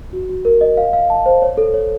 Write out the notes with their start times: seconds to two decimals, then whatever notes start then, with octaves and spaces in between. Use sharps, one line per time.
0.13 F#4
0.29 F#4
0.45 A#4
0.61 D#5
0.77 F5
0.93 F5
1.10 A5
1.26 C5
1.42 C#5
1.57 A4
1.74 C#5